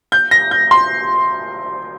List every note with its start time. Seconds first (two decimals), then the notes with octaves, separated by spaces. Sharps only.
0.12 G6
0.31 A#6
0.51 G6
0.71 C6